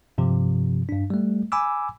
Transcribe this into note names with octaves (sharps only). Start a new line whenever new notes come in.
G2 C3 F3
G2 D4
G3 A3
G#5 B5 D6 E6